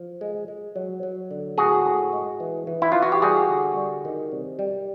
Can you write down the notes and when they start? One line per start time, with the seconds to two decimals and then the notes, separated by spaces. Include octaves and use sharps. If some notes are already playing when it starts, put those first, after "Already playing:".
Already playing: F3
0.21 G#3
0.48 G#3
0.76 F#3
1.03 F#3
1.31 D3
1.58 A2 F#4 G#4
1.86 A2
2.13 G#3
2.40 E3
2.67 E3
2.82 E4
2.92 E3 F4
3.02 F#4
3.12 G4
3.22 G3 F#4 G#4
3.49 D3
3.77 G3
4.05 D#3
4.32 C3
4.59 G3